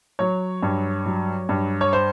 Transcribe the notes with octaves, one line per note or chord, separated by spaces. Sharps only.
F#3 C#5
G2
F#3
G2
C#5
C5